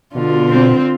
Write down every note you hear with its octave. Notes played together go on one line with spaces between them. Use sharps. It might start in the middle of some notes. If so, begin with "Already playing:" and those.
B2 D3 F4
C4